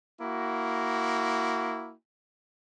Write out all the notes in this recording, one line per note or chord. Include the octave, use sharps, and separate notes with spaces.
A#3 E4 F#4